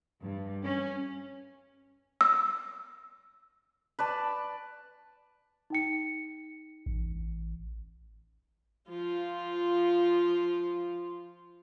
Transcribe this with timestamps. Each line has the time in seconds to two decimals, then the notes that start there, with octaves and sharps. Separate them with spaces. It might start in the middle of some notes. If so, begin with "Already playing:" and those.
0.21 G2
0.63 C#4
2.21 E6
3.99 B4 D5 A5
5.70 D#4 G5 C#7
6.86 A1
8.88 F3 F4